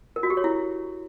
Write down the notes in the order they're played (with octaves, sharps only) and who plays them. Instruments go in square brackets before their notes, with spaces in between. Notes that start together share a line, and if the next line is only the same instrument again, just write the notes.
[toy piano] A#4
F#4
G4
C#5
E4